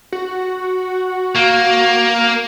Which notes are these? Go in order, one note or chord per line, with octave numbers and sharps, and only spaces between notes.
F#4
A#3